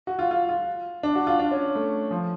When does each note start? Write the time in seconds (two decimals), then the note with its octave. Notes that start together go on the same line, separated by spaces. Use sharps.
0.07 F#4
0.19 F4
0.31 F4
0.49 F4
1.03 D4
1.15 F#4
1.27 F4
1.39 D4
1.51 C#4
1.75 A3
2.11 F3